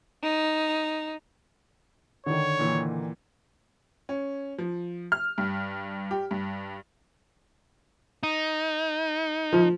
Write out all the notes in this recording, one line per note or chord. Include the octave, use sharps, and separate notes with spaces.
D#4
D3 D#3 C#5
A#2 E3
C#4
F3
F6
G2
G4
G2
D#4
F3